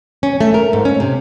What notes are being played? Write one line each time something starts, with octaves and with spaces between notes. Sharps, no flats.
C#4
A3
A#4
G#2
C#4
C3